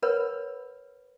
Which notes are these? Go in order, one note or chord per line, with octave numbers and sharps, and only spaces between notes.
A#4 B4 C#5 F#5 B5